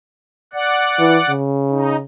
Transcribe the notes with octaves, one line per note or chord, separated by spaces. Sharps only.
D5 F#5
E3
C#3
D#4